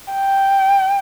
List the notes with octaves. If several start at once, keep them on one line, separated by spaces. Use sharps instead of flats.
G5